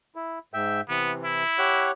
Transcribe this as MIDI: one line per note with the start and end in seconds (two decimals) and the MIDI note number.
0.15 0.39 64
0.54 0.81 44
0.54 0.81 76
0.54 0.81 79
0.89 1.44 48
0.89 1.44 52
0.89 1.12 59
1.24 1.90 64
1.58 1.91 67
1.58 1.91 73
1.58 1.91 78